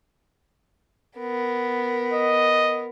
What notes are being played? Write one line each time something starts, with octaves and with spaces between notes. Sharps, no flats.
B3 A#4
D#5